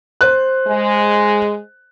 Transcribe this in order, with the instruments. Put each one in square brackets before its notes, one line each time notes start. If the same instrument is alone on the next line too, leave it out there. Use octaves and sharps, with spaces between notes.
[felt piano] C5 F#6
[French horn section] G#3